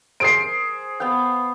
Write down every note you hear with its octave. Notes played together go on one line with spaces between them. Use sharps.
G#4 A#4 C5 C7 D7
B3 F5 G5